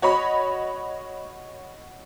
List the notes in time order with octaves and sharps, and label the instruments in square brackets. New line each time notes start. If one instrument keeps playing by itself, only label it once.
[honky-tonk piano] F#4 C#5 D#5 B5